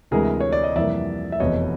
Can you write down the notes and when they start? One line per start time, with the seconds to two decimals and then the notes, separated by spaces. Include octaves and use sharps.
0.11 D2 C3 E3 G#3 G#4 A#4
0.40 C#5
0.53 D5
0.64 D#5
0.76 F2 C3 E3 G3 A#3 D5 E5
1.32 E5
1.40 F1 E2 B2 C#5 D#5